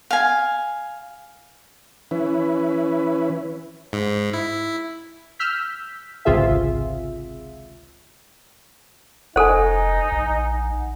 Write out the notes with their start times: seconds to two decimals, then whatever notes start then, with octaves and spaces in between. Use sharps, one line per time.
0.10 F5 G#5
2.11 E3 C#4 E4 B4
3.93 G#2
4.33 E4
5.39 E6 F6 G6 B6
6.25 G#1 C#2 C3 F4 G#4 E5
9.36 F1 D#4 A4 C5 F#5 G#5
10.12 A#1